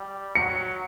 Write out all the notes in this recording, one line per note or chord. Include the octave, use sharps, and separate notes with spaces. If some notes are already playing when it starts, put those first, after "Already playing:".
Already playing: G3
F#3 C#7